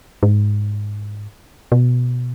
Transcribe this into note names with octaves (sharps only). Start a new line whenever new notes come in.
G#2
B2